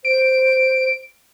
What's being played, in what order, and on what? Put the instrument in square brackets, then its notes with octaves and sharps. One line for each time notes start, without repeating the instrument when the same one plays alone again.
[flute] C5 [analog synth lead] D7